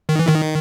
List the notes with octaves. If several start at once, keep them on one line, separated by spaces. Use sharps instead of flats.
D#3
E3
D#3